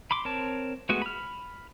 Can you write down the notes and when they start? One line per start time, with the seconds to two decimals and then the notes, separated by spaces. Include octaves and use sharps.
0.11 B5 C6 D6
0.25 C4 A#4 C#5 A5
0.89 G#3 A3 B3 F#4
1.02 B5 F6